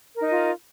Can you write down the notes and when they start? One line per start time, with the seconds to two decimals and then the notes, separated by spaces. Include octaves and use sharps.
0.16 A#4
0.21 D#4
0.26 D#5
0.31 F4